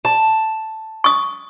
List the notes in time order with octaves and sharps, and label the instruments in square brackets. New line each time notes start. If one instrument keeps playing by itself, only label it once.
[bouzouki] A5
[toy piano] C#6 D#6